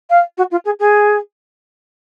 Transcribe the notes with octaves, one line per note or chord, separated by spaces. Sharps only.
F5
F#4
F4
G#4
G#4